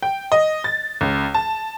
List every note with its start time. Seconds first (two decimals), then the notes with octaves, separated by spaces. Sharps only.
0.02 G5
0.32 D#5
0.64 A6
1.01 C#2
1.34 A5